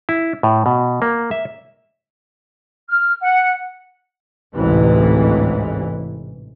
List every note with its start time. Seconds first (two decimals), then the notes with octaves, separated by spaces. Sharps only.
0.09 E4
0.43 A2
0.66 B2
1.02 A#3
1.31 E5
2.88 F6
3.21 F#5
4.56 A1 D2 G#2 C3 E3